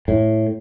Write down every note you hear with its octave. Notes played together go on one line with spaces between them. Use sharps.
A2